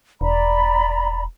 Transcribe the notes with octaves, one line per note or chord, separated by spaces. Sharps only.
E1 D5 A#5 B5